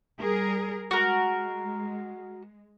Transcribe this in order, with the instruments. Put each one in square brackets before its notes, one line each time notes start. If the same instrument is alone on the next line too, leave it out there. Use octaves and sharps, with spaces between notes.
[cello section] G3 G#4 A#4
[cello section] G#3 [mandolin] F#4 A#4